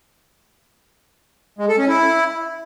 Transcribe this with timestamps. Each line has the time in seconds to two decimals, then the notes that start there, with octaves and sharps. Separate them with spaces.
1.59 G#3
1.68 A4
1.78 C#4
1.88 E4